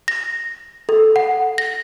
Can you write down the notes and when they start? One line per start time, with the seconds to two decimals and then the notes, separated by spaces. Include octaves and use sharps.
0.08 A#6
0.89 A4
1.16 F#5
1.58 A#6